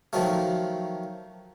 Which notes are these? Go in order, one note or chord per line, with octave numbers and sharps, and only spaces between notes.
D#3 F3 F#3 A3